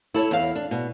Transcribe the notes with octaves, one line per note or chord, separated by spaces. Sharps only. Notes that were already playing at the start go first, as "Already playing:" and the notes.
E4 A4 C#5
E2 F5
D4
B2